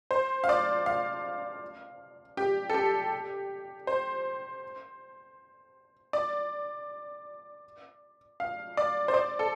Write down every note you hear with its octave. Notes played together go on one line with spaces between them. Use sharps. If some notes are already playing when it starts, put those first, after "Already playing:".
C5
F5
D5
F5
G4
A4
G4
C5
D5
F5
D5
C5
D5
A4